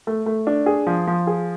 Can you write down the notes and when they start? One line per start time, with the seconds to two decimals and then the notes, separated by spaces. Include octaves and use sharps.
0.07 A3
0.26 A3
0.47 D4
0.66 G#4
0.87 F3
1.07 F3
1.27 G#4